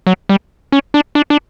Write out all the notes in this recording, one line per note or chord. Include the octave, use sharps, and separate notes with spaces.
F#3
G3
C#4
D4
D4
D4